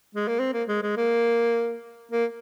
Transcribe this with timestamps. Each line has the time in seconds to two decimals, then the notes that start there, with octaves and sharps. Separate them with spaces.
0.15 G#3
0.27 A#3
0.40 C4
0.53 A#3
0.68 G#3
0.83 G#3
0.97 A#3
2.12 A#3